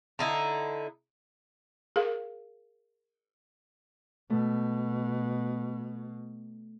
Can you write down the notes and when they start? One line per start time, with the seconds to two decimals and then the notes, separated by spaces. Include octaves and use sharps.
0.19 D3 D#4 E4
1.96 G#4 A#4 F5
4.30 B2 A3